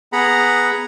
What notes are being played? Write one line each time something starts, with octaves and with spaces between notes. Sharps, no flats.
B3 G#4 F#5 A#5 B5